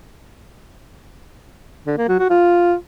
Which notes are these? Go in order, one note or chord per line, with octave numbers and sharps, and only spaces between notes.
D3
A#3
F#3
F#4
F4